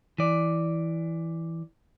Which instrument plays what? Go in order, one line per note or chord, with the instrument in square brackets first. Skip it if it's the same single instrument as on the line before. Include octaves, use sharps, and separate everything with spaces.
[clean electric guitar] E3 D5